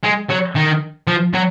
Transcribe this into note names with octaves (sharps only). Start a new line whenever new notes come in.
G#3
F#3
D#3
F3
F#3